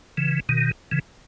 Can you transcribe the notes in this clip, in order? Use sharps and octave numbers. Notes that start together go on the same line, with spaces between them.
C#3 E3
B2 D#3
C#3 E3